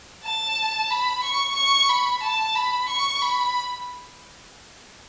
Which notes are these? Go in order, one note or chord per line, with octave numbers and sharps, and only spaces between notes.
A5
B5
C#6
C#6
B5
A5
B5
C#6
B5